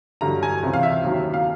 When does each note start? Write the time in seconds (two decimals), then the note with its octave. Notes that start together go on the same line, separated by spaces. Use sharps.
0.21 G2 D3 F#3 A#5
0.43 G#5
0.63 C#2 C3 E3
0.73 F5
0.83 E5
1.04 D#2 D#3 F#3
1.34 F5